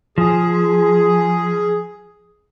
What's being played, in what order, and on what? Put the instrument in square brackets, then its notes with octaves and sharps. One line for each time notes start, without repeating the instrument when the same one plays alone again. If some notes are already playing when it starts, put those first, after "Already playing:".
[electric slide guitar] F3 [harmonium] G#4